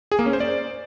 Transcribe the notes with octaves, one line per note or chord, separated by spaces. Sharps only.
G#4
A#3
C#4
C5
D5